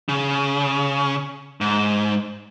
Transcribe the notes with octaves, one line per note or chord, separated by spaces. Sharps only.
C#3
G#2